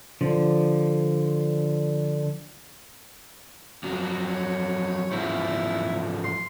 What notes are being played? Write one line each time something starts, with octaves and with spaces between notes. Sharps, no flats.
D3 F3
F2 F#3
C#5
E2 G#2 F3 E4
C6